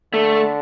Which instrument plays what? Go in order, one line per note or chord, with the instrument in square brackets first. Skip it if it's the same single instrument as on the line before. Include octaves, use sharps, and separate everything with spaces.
[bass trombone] D3 [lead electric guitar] A3